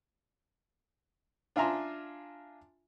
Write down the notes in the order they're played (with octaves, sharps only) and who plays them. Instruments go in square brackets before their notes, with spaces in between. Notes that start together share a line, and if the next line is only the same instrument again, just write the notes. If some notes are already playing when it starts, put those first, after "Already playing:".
[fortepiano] D4 F4 E5 G#5 A#5 C6